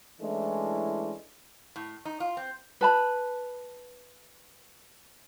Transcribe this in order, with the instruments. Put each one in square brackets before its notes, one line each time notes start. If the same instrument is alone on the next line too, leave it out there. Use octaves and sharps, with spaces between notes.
[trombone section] E3 G#3 A3 C#4 D4 E4
[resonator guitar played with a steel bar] A2
D#4
F4
C4
[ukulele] B4 A5 B5